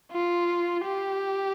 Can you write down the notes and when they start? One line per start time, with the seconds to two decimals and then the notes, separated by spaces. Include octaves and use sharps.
0.12 F4
0.85 G4